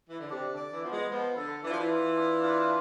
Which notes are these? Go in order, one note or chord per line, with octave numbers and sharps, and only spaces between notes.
E3
D3
C3 D4
D3
D5
E3
F3 B3
G#3
F3 B3
D3 A4
E3 D4
F3
E3
F4
D4
F4